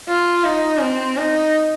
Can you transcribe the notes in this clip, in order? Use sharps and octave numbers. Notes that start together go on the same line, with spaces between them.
F4
D#4
C4
D#4